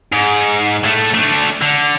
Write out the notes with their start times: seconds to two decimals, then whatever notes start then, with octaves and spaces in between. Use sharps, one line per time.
0.13 G#2
0.84 A2 A3
1.14 A3 D4
1.62 D3